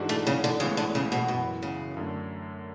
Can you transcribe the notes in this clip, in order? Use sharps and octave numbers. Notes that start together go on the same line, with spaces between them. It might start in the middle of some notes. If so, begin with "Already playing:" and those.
Already playing: G#2 E3 G#3 D4 F#4
A3
C#3
D3
A1 A2 C#3 G#3 B3
D3
C#3
B2
F#2 B2 E3 B3 F#4
C#3
F#2 D3 A3